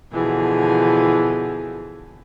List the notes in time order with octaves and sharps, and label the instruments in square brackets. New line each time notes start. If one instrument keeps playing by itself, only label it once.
[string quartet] B2 D3 E3 F3 G#4